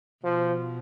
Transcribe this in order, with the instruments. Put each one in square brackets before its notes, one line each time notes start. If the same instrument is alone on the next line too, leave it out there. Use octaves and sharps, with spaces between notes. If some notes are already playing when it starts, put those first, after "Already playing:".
[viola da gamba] B2 [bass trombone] F3